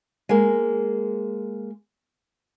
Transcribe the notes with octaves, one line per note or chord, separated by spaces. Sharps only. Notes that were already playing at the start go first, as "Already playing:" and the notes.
G#3 A#3